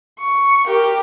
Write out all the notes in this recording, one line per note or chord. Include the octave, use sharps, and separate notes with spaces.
C#6
G4 A#4